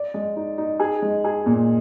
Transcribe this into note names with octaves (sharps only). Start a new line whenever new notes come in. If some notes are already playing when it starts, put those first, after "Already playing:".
Already playing: D5
G#3
D#4
D#4
G#4
G#3
G#4
A#2